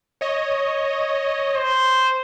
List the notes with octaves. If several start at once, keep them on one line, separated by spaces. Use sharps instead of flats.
C#5 D#5
C5